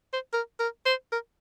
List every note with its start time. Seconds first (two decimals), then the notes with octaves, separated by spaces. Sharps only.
0.13 C5
0.33 A#4
0.60 A#4
0.86 C5
1.12 A#4